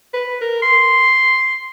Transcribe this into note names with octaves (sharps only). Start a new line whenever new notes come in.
B4
A#4
C6